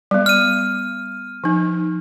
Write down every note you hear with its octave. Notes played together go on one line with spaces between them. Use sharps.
G3 B3
F6 D#7
F3 D#4